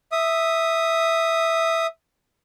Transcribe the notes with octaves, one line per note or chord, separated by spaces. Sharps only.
E5 D#6